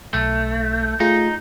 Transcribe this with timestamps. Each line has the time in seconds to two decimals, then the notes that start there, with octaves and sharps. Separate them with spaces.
0.14 B1 A3
1.00 A3 D#4 F4 G#4